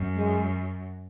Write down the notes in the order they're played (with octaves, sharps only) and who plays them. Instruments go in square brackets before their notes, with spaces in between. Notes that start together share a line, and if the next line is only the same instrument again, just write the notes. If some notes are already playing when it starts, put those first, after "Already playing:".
Already playing: [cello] F#2
[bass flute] G#3